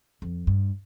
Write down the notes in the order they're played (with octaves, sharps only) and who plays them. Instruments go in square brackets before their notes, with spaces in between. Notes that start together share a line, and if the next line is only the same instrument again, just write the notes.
[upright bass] F2
G2